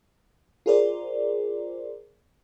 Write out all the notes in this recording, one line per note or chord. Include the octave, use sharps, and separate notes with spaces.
F4 G#4 A#4 C5 D5